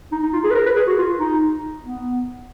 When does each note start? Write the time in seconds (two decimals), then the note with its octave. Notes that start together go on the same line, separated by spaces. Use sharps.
0.12 D#4
0.23 D#4
0.33 F4
0.44 G#4
0.51 B4
0.55 A#4
0.66 B4
0.76 G#4
0.87 F#4
0.98 F4
1.20 D#4
1.84 B3